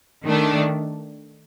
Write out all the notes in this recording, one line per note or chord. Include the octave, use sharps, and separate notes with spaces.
D#3 A3 D4